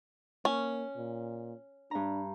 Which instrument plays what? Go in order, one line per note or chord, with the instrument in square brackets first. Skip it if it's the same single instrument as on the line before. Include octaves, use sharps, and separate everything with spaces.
[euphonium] A#3 [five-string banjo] C#4
[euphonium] A#2
[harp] G2 A#5 [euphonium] D4